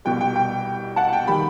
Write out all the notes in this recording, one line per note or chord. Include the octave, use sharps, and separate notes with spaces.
C2 B2 G3 G5
G5
G5
F#5 A5
G5
D#3 G3 G5 B5